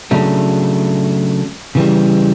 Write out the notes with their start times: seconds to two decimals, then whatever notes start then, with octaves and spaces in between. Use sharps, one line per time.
0.11 C#3 F#3 A3 D4
1.75 C#3 E3 G3